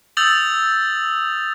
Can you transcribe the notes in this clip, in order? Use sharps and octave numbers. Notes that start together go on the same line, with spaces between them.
D#6 E6 G6 A6 F7 F#7